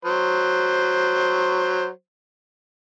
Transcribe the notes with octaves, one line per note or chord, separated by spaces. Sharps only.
F#3 C5